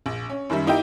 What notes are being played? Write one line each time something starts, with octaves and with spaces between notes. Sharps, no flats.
A#1
C#4
F#2 D#3 G3 E5
A#3 D#4 E4 G4 G5